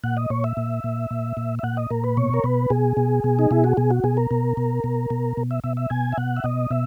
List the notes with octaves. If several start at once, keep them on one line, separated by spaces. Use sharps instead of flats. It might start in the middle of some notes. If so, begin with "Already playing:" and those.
A#2 F#5
D#5
A#2 C#5
E5
A#2
A#2
A#2
A#2
E5
A#2 F#5
D#5
A#2 A#4
B4
B2 C#5
A#4
B2 B4
B2 G#4
B2
B2
D#4
B2 E4
F#4
B2 G#4
F#4
B2 G#4
A#4
B2
B2
B2
B2
B2
E5
B2 E5
E5
B2 G#5
E5
B2 F#5
E5
B2 D#5
B2 E5